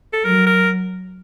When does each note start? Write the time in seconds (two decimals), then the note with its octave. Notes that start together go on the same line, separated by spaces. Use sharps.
0.13 A4
0.25 F#3 A#4
0.47 A#4